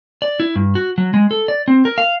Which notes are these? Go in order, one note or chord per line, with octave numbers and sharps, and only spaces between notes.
D5
E4
G2
F#4
F#3
G#3
A4
D5
C4
A#4
F5